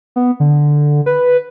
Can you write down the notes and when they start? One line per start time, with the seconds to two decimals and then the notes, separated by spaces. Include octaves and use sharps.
0.16 B3
0.40 D3
1.06 B4